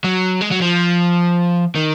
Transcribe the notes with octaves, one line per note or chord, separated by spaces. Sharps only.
F#3
G#3
F#3
F3
D#3